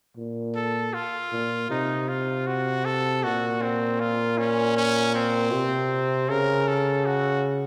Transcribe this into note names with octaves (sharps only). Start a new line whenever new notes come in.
A#2
A4
F4
A#2
C3 D#4
F4
F#4
A4
A#2 F#4
C4
F4
C#4
C#4
C4
C3
C#3 A#4
A4
F#4